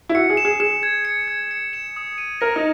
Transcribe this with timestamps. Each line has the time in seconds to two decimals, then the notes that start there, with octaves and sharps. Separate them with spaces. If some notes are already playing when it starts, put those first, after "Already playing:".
0.09 E4
0.14 F#4 C#7
0.30 G#4
0.37 E7
0.45 G#4
0.60 G#4 E7
0.83 G#6
1.05 C#7
1.28 G#6
1.51 C#7
1.73 E7
1.96 D#6
2.18 D#7
2.41 A#4 A#6
2.56 D#4